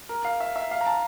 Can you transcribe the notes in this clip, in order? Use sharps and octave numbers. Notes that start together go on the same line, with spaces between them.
A#4
F5
E5
E5
F5
A#5
A5